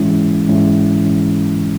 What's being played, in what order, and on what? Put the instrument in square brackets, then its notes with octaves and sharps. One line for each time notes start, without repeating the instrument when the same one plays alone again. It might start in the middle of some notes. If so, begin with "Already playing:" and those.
Already playing: [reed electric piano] G#2 E3 G#3 C#4 E4
G#2 E3 G#3 C#4 E4
G#2 E3 G#3 C#4 E4